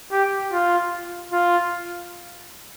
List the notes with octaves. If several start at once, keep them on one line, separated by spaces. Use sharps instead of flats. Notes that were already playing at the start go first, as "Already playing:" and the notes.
G4
F4
F4